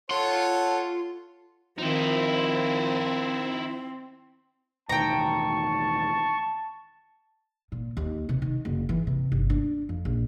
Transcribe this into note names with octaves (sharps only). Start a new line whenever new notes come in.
F4 A4 C#5 F#5 C6
D#3 F3 C4 D#4 E4
E1 A2 D#3 G5 A5 A#5 C#6
A#2
D#2
C3
D#3
F#1
E3
C3
G1
D4
F2
A#1